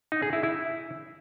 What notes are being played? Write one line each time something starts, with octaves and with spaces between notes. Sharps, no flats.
D#4
G#4
E4
E4